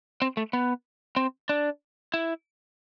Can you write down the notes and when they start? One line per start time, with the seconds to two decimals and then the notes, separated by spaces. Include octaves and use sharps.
0.22 C4
0.37 A3
0.53 B3
1.16 C4
1.49 D4
2.14 E4